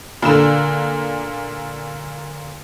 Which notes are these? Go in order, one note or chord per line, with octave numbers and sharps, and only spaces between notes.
A#2 D3 E7